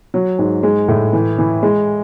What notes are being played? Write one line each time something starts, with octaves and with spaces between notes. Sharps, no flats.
F#3
G#2
G#3
A2
E3
E3
G#3